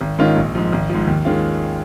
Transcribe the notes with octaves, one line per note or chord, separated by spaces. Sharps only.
G#1
G#2 D#3 C#4 F4
A#1
G#2 F3
G#1
G#2 F3
D#2
D#3 G#3 C#4 F4